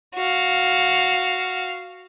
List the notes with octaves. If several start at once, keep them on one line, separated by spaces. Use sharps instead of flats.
F#4 F5